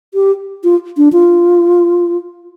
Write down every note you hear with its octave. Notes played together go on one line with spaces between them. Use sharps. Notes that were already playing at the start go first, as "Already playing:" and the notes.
G4
F4
D4
F4